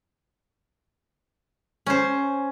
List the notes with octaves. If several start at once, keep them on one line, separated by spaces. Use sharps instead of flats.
C#4 C5